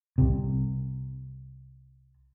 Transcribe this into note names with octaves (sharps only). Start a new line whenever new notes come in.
C2 C3